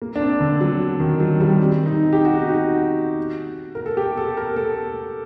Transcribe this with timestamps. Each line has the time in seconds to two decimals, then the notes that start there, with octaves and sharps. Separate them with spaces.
0.02 A#3
0.16 D4
0.21 C4
0.40 D3
0.61 F#3
1.00 D#3
1.20 F#3
1.40 G3
1.59 C4
1.86 D#4
2.13 G4
2.25 F#4
2.37 D#4
2.49 F#4
3.75 A#4
3.86 A4
3.97 G4
4.17 A4
4.37 A#4
4.56 A4